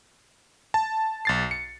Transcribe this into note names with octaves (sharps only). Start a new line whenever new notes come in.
A5
B1 A6 C7
C#7